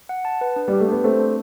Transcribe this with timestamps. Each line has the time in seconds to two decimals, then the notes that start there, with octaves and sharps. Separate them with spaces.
0.09 F#5
0.25 A5
0.41 B4
0.56 D4
0.68 G3
0.73 G4
0.80 A3
0.88 B3 D4
1.04 A3 C4 C5
1.20 D4